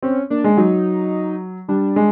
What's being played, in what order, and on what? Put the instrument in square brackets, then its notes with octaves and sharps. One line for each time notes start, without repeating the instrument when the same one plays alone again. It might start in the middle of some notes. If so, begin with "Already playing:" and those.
[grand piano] C4 [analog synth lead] C#4
[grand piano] A#3 [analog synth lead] D4
[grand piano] G#3
[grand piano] F#3 [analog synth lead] D#4
[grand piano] G3 [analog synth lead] D4
[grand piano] G#3